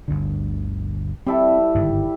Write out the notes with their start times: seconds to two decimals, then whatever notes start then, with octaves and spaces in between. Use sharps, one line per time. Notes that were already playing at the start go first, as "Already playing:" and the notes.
0.08 G1 D2 D3
1.27 G3 C4 E4 A4
1.74 G1 G#2 D#3